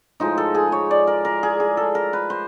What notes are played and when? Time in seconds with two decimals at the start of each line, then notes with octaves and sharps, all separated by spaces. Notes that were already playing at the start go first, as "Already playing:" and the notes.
0.20 A2 F3 G#3 D#4
0.38 A4
0.55 G#4
0.72 C#5
0.91 D5
1.07 A#4
1.25 A#4
1.43 G#4
1.60 G#4
1.77 A4
1.95 A#4
2.13 B4
2.30 C5